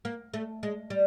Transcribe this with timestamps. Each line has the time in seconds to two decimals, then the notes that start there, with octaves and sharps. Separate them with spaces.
0.05 A#3
0.34 A3
0.63 G#3
0.90 G3